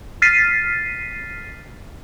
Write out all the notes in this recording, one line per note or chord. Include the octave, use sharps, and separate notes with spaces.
F6 A6 B6 C7 D#7